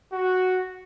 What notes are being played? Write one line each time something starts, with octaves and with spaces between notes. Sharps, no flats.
F#4